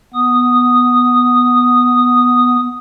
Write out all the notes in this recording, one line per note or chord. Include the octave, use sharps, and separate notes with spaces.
B3 D#6